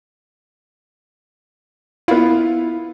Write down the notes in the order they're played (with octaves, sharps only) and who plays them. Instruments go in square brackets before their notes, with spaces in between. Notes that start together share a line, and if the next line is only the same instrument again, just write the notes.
[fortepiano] B3 F4 [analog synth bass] E4